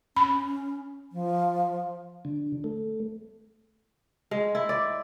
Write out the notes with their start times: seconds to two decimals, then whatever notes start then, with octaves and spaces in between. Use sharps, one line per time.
0.16 C#4 B5
1.12 F3
2.25 D3
2.64 A3
4.31 G#3
4.55 E4
4.69 D5